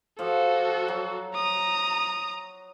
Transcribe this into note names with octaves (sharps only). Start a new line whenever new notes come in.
F3 F#4 G4 A4 F5
F#3
A#5 D#6